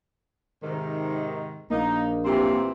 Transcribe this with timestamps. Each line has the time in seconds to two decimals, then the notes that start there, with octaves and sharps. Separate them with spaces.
0.62 G#2 C3 D#3
1.70 A#1 A#3 D#4
2.25 A#2 E3 C4 G4